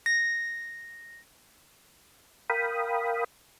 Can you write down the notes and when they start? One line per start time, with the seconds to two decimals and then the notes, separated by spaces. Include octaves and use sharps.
0.06 A#6
2.50 A#4 F5 G5 B5 D#6